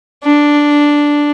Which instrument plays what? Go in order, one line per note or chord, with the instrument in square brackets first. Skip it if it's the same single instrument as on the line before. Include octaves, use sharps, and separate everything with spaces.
[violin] D4